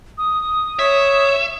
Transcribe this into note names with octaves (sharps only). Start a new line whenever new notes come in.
D#6
C#5 E5